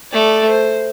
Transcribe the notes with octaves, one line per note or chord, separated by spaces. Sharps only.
A3 D5
C5